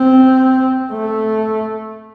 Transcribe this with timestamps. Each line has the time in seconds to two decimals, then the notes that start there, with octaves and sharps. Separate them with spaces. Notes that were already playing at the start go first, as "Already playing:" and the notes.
Already playing: C4
0.92 A3